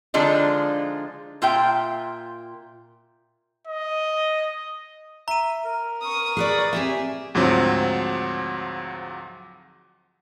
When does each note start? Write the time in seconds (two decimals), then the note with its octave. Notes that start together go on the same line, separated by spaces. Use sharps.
0.14 D3 F3 G#3 D4 D#4 F4
1.42 A#2 F4 E5 G5
3.67 D#5
5.28 E5 A#5 D#7
5.65 A#4
6.02 C#6 D#6
6.37 G#4 B4 D5
6.73 C4 G4 E5 G#5
7.35 D2 G#2 F3 F#3 C4